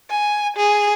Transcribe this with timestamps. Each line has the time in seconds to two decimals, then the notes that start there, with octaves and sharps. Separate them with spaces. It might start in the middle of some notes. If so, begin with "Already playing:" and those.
0.10 G#5
0.57 G#4